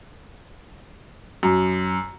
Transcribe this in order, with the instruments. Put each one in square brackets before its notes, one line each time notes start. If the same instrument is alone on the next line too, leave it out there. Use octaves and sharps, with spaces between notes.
[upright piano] F#2